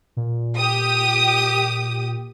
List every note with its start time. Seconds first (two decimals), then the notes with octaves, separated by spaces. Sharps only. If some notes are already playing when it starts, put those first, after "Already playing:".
0.17 A#2
0.57 G4 D#6